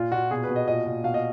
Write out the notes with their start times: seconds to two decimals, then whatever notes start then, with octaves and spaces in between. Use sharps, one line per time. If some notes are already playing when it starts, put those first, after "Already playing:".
Already playing: A#2 F4
0.12 A#2 F#4
0.31 B2 G#4
0.44 B4
0.49 B2
0.56 D#5
0.68 A#2 D#5
0.86 A#2
1.04 B2 F5
1.14 D#5